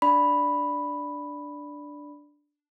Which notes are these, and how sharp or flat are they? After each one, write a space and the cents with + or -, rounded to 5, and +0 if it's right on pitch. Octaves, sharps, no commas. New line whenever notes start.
D4 +0 D5 +0 B5 +0